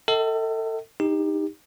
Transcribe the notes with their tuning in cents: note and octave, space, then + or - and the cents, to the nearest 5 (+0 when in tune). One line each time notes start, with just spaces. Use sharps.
A4 +30 D#5 +45 G5 -45
D#4 +0 G4 +25